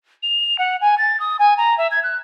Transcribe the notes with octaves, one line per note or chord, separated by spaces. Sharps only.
F7
F#5
G#5
A6
D#6
G#5
A#5
E5
G#6
F#6